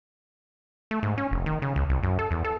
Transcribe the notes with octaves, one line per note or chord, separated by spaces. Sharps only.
A3
G#2
C#4
F1
D#3
C#3
C#2
C2
F#2
A4
E2
A4